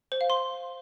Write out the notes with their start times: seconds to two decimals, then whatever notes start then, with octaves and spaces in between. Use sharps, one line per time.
0.12 C5
0.21 F5
0.30 C6